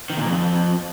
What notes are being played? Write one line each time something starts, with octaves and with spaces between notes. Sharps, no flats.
D#3
A#2
F2